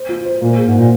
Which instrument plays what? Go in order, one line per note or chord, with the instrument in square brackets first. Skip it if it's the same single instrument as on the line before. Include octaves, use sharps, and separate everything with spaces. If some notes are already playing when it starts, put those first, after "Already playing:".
Already playing: [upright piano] C5
F4
C5
[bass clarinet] A#2 [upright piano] A#3
[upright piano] G#4
[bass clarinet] G#2
[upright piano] A#3
[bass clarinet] A#2